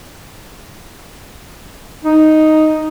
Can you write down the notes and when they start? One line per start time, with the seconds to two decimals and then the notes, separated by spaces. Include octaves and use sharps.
2.03 D#4